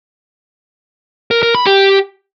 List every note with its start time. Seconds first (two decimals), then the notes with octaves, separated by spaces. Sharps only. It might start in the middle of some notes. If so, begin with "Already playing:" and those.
1.31 A#4
1.43 A#4
1.55 B5
1.66 G4